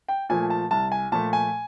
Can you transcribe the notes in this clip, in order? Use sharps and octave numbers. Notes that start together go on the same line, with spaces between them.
G5
A#2 F3 A3 G#5
A5
C2 A5
G#5
A#2 F3 A3 A5
G#5